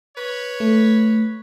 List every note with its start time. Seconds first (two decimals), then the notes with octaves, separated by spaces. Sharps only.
0.17 B4 C#5
0.60 A3